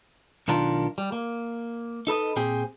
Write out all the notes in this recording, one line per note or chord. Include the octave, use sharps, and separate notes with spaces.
B1 D#3 D4 F4 A#4
G3
A#3
D#4 A4 B4 D#5
A#2 C4 G4 G#4